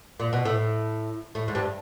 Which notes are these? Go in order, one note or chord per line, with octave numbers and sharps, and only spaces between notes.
A#2
B2
A2
A2
G#2
G2